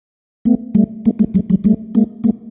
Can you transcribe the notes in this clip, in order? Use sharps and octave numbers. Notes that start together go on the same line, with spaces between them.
A3 B3
G3 A3
G#3 A#3
G3 A3
F#3 G#3
F#3 G#3
G3 A3
G#3 A#3
G#3 A#3